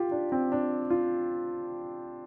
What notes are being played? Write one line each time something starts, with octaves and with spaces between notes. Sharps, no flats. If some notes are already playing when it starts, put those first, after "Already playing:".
Already playing: F4 G4
D4
C4
D4
F4